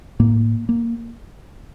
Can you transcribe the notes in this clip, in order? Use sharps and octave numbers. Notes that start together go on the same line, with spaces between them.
A2 A#3
A#3